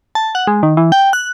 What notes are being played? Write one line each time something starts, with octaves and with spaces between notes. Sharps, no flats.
A5
F#5
G#3
D#3
E3
G5
F#6